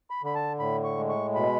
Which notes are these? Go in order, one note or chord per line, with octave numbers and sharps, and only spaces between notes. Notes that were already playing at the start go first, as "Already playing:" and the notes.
B5
D3 B5
A5
A2 B5
C#6
G#3
C#6
B2 B5